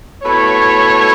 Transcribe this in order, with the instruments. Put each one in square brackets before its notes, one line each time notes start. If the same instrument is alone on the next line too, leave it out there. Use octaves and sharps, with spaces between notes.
[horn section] B2 A3 E4 C#5